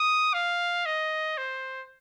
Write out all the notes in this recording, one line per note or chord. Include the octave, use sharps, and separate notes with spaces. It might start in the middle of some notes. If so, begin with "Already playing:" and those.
Already playing: D#6
F5
D#5
C5